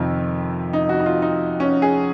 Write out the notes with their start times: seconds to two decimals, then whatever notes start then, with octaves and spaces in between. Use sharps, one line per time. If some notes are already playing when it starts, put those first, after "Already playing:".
Already playing: F2 C3 D#3 F4
0.73 D#4
0.89 F#4
1.00 D#4
1.06 F4
1.22 D#4
1.60 C#4
1.82 G#4